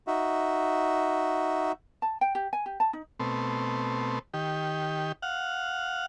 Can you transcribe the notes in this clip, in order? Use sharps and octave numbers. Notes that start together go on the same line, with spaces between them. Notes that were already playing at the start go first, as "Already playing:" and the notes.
D#4 F#4 E5
A5
G5
G4
G#5
G4
A5
D#4
B2 A3 C4
D#3 G4
F5 F#5